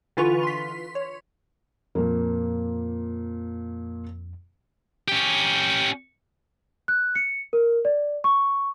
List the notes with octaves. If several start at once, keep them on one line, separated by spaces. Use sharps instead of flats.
D3 E3 F4 B4 C#6 F7
C6 B6
C#5
F2 A#2 F3 A#3
C#4 G4
F#6
C#7
A#4
D5
C#6